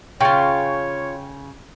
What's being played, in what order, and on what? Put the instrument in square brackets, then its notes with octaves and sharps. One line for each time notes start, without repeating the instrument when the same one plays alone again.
[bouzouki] C#3 [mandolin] C#4 F4 [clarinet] C#5 [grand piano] G5